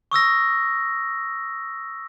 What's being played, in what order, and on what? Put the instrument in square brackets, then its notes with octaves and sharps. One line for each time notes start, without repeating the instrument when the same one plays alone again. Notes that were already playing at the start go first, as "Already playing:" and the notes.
[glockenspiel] C#6 D#6 E6 A#6